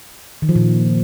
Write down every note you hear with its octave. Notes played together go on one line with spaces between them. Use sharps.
D#3
F3
A#2